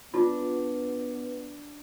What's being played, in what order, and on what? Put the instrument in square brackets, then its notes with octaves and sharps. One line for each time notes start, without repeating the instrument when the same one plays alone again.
[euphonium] B3 [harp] D4 [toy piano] F4